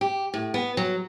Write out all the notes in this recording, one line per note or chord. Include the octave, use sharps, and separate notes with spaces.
G4
A2
B3
F#3